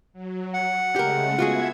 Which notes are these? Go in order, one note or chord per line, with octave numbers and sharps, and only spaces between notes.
F#3
F#5
C#3 G#3 A3 G4 A#4
B3 F4 F#4 G#4 E5 G#6